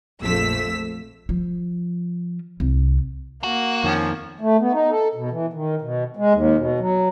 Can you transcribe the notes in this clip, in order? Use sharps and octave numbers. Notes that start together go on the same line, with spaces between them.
A#1 F2 F3 A3 E6 B6
F3
C2
A#3 F#4
F2 D#3 F3 C#4
A3
B3
D#4
A4
B2
E3
D#3
B2
G#3
D#2
B2
F#3